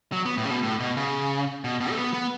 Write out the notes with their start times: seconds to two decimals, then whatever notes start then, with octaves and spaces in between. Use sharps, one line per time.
0.12 F#3
0.26 B3
0.37 A2
0.45 C#3
0.50 B2
0.63 A2
0.80 B2
0.97 C#3
1.64 B2
1.81 B2
1.90 A3
1.97 B3
2.14 B3